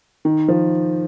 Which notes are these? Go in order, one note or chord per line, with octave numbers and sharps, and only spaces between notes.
D#3
F3